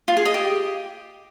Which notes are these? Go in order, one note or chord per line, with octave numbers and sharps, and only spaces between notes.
F4
G#4
D#5
G4